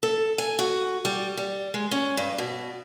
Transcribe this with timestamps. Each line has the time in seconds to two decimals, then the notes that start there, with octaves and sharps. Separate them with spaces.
0.03 A4
0.38 G#5
0.59 F#4
1.05 G3
1.37 G3
1.74 G#3
1.91 C#4
2.17 G2
2.38 B2